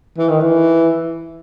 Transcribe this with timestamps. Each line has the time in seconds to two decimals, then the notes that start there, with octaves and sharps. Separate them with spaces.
0.18 E3
0.29 D#3
0.41 E3